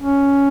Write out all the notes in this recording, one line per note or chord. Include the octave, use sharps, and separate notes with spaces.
C#4